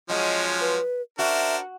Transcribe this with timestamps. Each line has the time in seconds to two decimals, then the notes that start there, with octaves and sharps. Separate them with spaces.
0.09 F3 F#3 G#3 C#4 D#5
0.61 B4
1.19 D4 F#4 A#4 C5 E5